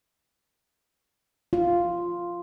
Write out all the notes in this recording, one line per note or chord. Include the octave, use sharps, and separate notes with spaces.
F4